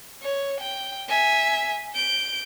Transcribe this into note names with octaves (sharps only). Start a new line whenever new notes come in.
C#5
G5
E5 G#5
G6 D7